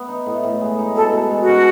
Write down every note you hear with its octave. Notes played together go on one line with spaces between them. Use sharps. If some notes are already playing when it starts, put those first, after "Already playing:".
Already playing: B3
D#4
A2
A2
G#3
D#4
B2 A4
B2
G#3
F#4
C#4